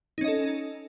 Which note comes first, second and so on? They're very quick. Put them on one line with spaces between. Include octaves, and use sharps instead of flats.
D#4 C#4 D#5 A4